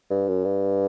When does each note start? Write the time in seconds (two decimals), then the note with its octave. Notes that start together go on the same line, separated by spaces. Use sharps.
0.10 G2
0.28 F#2
0.44 G2